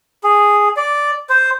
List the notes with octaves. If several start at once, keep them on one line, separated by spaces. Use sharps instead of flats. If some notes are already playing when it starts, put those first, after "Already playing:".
G#4
D5
C5